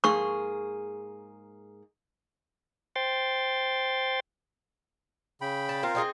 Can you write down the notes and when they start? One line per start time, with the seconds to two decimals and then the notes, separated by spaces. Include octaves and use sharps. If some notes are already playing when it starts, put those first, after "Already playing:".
0.04 G#2 A#3 G#4 C#6
2.96 C5 G5 C6 A6
5.41 C#3 G5 B5
5.69 A5
5.83 C4 F4 A#4 F5
5.95 C4 D#4 G#4